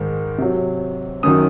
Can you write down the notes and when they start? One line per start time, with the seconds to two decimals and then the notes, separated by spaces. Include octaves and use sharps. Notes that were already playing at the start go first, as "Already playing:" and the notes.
Already playing: G#2 D#3 G#3
0.38 C3 F#3
1.23 F#2 D#3 F#3 D#6